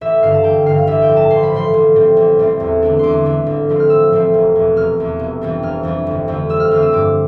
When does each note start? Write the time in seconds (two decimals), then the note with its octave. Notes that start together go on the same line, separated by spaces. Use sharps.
0.01 A1 E5
0.23 G2 D3 F5
0.34 A5
0.44 A1 G5
0.66 G2 D3 F5
0.78 F5
0.87 A1 E5
1.02 G5
1.09 A2 F3
1.17 A5
1.30 A1 C6
1.43 B5
1.53 A2 F3 C6
1.74 A1
1.95 A2 G3 C4
2.17 A1
2.39 A2 G3 C4
2.60 E2
2.82 D3 A3 D4
2.99 E2 C6 D6
3.25 D3 A3 D4
3.46 A1
3.69 A2 F3 A3 C4
3.80 F6
3.90 A1 E6
4.12 A2 F3 A3 C4
4.34 F1
4.55 E2 B2
4.77 F1 F6
4.98 E2 B2
5.19 F1
5.41 F2 E3 G3 D4
5.63 F1 F6
5.83 F2 E3 G3 D4
6.07 G1
6.28 F2 D3 A3 C4
6.49 G1 E6
6.60 F6
6.71 F2 D3 A3 C4 F6
6.82 E6
6.93 G2 D6